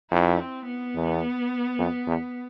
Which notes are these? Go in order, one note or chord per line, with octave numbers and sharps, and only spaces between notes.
F2 E4
C4
B3
E2
F2
E2